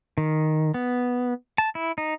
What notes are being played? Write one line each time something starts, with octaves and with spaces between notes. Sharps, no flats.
D#3
B3
A5
E4
D#4